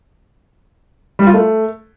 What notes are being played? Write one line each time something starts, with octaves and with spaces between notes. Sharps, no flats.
G3
F4
A3